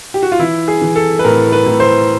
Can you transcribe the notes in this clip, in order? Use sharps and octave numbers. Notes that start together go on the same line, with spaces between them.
G4
F#4
F4
E3 E4
G#4
E3
A4
B4
A2 A#4
B4
A2
C5